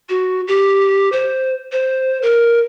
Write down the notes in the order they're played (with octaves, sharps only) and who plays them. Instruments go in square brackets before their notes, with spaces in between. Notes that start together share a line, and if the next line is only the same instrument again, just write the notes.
[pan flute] F#4
G4
C5
C5
A#4